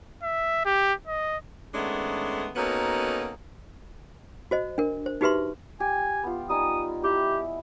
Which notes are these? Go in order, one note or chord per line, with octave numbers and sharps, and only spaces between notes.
E5
G4
D#5
D#3 G#3 A3 B3 C#4 D4
A#3 B3 C#4 D#4 F#4 A4
F#4 C5 D#5
D4 A#4
C5
D#4 F#4 G4 B4 E5 C6
G4 G#5
B3 F4
G3 D#4 G#5 D#6
E4 G4